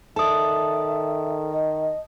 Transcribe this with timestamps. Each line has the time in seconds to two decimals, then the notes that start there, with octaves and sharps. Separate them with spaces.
0.16 D#3 A4 D5 E5 A5 D#6
1.51 D#5